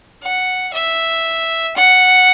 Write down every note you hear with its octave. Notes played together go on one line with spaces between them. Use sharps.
F#5
E5
F#5